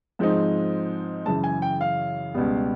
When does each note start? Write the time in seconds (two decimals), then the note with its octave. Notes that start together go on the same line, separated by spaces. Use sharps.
0.19 G#2 F3 G#3 C4 D#4
1.26 F#2 C#3 E3 G#3 A5
1.44 G#5
1.62 G5
1.81 F5
2.34 C#2 B2 G3 B3